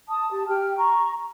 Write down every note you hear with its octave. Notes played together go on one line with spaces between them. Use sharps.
A5 D#6
G4 A5
G4 G5 F6
A#5 C#6